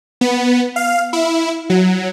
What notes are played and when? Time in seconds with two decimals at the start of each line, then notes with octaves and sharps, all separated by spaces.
0.21 B3
0.76 F5
1.13 E4
1.70 F#3